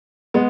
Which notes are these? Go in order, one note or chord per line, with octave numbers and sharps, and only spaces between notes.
G#3 B3